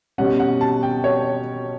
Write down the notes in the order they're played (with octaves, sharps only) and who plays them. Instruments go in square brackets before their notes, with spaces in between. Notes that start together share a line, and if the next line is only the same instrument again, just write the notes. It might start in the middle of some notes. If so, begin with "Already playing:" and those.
[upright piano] B2 G3 C#4 [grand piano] F#5
[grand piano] F#5
A5
G5
C#5